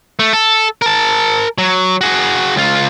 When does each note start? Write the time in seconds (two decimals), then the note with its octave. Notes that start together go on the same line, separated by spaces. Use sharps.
0.19 A3
0.33 A4
0.82 A#4 A5
1.58 F#3
2.01 F#4 G#4
2.56 C#2 F4